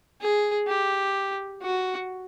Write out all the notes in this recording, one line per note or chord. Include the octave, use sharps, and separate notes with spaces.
G#4
G4
F#4